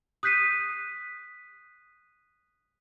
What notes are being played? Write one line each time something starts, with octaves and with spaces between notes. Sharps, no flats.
D#6 F#6 G6 B6 C7 D#7